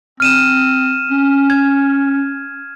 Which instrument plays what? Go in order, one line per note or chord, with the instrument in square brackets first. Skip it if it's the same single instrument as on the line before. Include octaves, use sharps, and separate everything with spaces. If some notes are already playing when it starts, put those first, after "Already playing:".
[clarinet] C4 [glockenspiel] F6 D#7 E7
[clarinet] C#4
[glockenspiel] G#6